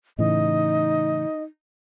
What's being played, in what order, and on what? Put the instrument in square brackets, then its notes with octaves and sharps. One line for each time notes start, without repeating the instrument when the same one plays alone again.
[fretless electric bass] A2 C#3 E3 [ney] D#4 [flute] D#5